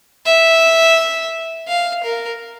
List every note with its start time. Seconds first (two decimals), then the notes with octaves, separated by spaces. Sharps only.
0.26 E5
1.68 F5
2.03 A#4